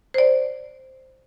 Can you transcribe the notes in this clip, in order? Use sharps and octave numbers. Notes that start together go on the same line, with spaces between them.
C5 D5